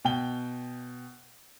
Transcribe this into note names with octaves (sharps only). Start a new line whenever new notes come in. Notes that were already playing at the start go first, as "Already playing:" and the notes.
B2 G5 G7